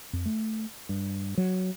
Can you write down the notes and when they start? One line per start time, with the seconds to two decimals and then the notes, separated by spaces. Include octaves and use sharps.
0.13 F2
0.26 A3
0.89 G2
1.38 F#3